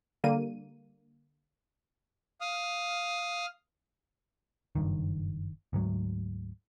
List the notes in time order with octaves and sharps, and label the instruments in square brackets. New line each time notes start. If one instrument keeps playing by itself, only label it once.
[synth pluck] D3 G3 A#3 D#7
[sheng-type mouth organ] F5 D#6 F6
[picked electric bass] F#1 G2 D#3
D2 G#2 F#3